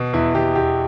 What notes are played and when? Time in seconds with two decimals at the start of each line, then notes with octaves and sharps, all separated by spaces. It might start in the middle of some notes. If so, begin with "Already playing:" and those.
Already playing: B2
0.13 E2 E4
0.34 B2 G4
0.55 E2 G4